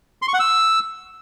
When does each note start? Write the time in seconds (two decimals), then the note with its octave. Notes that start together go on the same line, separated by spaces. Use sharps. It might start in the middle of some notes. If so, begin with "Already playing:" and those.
0.22 C6
0.28 C#6
0.34 F#5
0.39 E6